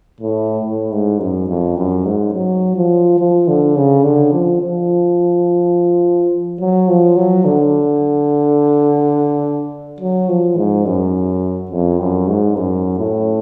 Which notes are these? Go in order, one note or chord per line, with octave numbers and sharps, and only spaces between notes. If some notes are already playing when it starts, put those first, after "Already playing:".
A2
A2
G#2
F#2
F2
F#2
G#2
F#3
F3
F3
D3
C#3
D3
F3
F3
F#3
F3
F#3
D3
F#3
F3
G#2
F#2
F2
F#2
G#2
F#2
A2